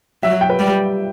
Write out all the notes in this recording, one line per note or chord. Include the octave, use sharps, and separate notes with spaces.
F#3 E5
G5
B4
G3